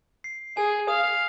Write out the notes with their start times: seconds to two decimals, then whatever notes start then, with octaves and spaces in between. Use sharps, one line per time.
0.24 C7
0.57 G#4 G#5
0.88 F5 D#6